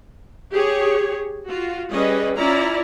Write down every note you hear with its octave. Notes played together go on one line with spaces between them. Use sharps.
G4 G#4 C#5
F4 F#4
G3 C#4 G#4 B4 D#5
C#4 E4 F4 D5 A#5